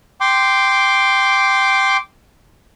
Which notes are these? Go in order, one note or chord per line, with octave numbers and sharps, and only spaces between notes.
G5 C6 D6